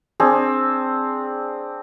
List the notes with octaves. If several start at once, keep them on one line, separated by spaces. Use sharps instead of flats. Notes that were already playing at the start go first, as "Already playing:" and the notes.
C4 D4 G#4